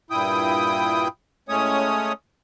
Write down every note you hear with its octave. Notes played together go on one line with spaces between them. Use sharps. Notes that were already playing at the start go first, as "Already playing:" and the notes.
G2 A#2 E4 G5 D#6
A2 G#3 A3 C#4 C#5 D#6